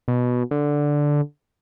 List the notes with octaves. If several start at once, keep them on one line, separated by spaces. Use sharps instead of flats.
B2
D3